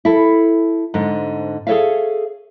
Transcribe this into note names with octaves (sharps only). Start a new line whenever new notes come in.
E4 A4
G#2 D3 C4
G#4 A4 B4 C#5 E5 F5